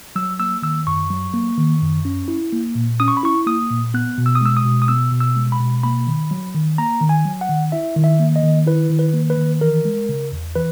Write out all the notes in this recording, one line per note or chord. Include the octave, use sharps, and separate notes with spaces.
F#3 E6
A#3 E6
D#3 E6
F#2 C#6
F#3
A#3
D#3
F#2
C#4
E4
A#3
A#2
C#4 D#6
C#6
B5
E4 C#6
A#3 D#6
A#2
B3 F#6
B2
E6
D#6
G#3 E6
D#6
B2
D#6
B3 E6
B2
E6
G#3
B5
B2
A#3 B5
D#3
F#3
D#3
A#3 A#5
D#3
G#5
F#3
F#5
D#3
E4 E5
D#3
E5
A#3
D#5
D#3
E4 B4
D#3
B4
A#3
B4
D#3
E3 A#4
G#3
C#3
E2
E3 B4